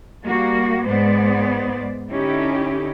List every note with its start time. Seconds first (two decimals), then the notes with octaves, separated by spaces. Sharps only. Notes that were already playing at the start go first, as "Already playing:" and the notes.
0.23 G3 A#3 F#4
0.84 G#2 G#3 B3 C5 D5
2.10 D3 C#4 D#4 E4 G4